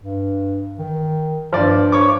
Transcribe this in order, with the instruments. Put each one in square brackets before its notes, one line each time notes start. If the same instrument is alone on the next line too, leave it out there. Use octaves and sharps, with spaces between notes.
[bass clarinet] G2
D#3
[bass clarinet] G2 [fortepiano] F3 D5
[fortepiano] C#5 C#6 D6